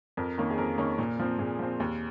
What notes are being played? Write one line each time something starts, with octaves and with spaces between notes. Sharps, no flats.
F2 A#4
D#3 A#3 C#4
G#4
F2 A#4
D#3 A#3 C#4
A#2
F3 C4
A#2 G#4
F3 C4
D#2